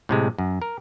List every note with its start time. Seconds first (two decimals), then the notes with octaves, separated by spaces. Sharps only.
0.09 A2 C3 G#3
0.38 F#2
0.62 A#4